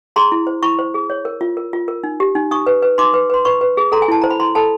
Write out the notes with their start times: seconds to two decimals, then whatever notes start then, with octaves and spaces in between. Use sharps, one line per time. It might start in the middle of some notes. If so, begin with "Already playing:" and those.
0.16 G#4 A#5 C6
0.32 E4
0.47 C5
0.63 E4 B5 C#6
0.79 C5
0.94 G#4
1.10 C#5
1.25 A#4
1.41 F4
1.57 A#4
1.73 F4
1.88 A#4
2.04 D#4
2.20 G4
2.35 D#4
2.51 D#4 C#6 D#6
2.67 B4
2.82 B4
2.98 D#4 C6 D6
3.14 B4
3.30 B4 C6
3.45 B4 B5 C#6
3.61 B4
3.77 G#4
3.92 A4 A#5 C6
4.02 G#5
4.08 E4 A5
4.21 C5 A#5
4.30 B5
4.40 E4 A#5 C6
4.55 A4 A5 B5